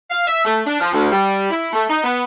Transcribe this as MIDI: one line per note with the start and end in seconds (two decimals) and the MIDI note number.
0.10 0.26 77
0.27 0.44 76
0.45 0.61 57
0.66 0.77 62
0.81 0.93 53
0.93 1.08 38
1.11 1.48 55
1.51 1.73 64
1.73 1.84 57
1.89 2.01 63
2.04 2.23 59